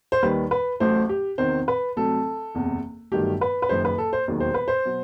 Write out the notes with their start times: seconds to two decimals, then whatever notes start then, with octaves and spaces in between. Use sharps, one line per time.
0.12 C5
0.22 D#2 D#3 G3 B4
0.51 B4
0.80 A1 A2 F#3 A3 C5
1.09 G4
1.38 E2 C3 D#3 C5
1.68 B4
1.96 C2 C3 F#3 A3 A4
2.55 F#1 E2 C3
3.12 G1 G2 D#3 F#3 A3 G4
3.41 B4
3.62 B4
3.69 F#1 F#2 D#3 C5
3.85 B4
3.98 A4
4.13 C5
4.28 E1 D#2 D#3 F#3
4.40 C5
4.54 B4
4.68 C5
4.85 B2 F#3